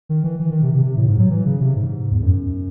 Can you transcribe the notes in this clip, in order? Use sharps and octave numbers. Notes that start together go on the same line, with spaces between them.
D#3
E3
E3
D#3
C3
C3
C3
A2
G#2
F#3
E3
C#3
C3
G#2
E2
F#2